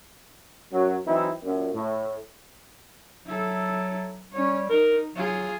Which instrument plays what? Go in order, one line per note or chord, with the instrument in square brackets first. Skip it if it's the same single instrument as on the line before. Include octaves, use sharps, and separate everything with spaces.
[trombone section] F#2 F#3
E3 F#3 C4 D#4 E4
F#2 A#2
A2
[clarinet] F#3 [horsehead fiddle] E4 A4
[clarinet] G3 [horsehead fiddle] C#4 C#5
[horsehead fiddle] D#4 [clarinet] A#4
[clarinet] F#3 [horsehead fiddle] F4 G#4